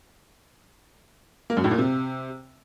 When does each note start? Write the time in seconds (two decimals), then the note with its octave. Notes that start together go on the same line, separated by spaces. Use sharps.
1.50 A#3
1.57 F#2
1.64 A2
1.71 A#2
1.78 C3